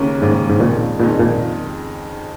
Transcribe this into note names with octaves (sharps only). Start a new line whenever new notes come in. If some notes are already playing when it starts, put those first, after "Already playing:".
Already playing: D#2 C#3 A#3 C#4
D#2 G#2 C#3 A#3 C#4
G#2
F2 A#2 D#3 G#3 D#4
F2 A#2 D#3 G#3 D#4
A#2